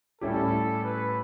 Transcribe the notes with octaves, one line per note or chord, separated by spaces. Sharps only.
A2 G3 C#4 E4 G4 A4
B4